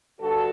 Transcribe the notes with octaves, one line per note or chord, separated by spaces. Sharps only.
G2 D3 F#4 A4